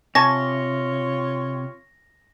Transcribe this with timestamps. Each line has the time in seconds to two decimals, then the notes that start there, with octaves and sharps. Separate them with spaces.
0.15 C3 F4 C#5 G#5 A5 C#6 A#6